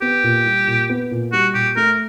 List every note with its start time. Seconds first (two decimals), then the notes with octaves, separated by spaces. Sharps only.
0.02 B3 G4
0.24 A#2
0.46 G3
0.67 A#2
0.89 B3
1.11 A#2
1.32 G3 F#4
1.54 A#2 G4
1.76 A3 A#4